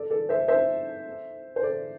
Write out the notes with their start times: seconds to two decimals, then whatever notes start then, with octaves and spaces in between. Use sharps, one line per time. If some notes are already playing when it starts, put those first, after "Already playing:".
Already playing: A4 D5
0.10 A4 D5
0.29 C5 E5
0.48 C5 E5
1.56 C5
1.63 A4 D5